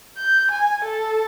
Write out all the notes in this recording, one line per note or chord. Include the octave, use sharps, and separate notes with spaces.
G6
G#5
A4